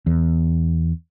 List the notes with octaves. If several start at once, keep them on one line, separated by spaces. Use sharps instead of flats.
E2